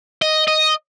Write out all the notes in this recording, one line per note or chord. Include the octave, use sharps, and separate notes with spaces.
D#5
D#5